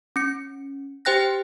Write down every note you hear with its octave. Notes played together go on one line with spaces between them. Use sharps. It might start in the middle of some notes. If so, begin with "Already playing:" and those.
C#4 C#7
G4 C5 G5 F#6 A#6